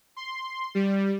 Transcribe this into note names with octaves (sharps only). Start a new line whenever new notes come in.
C6
G3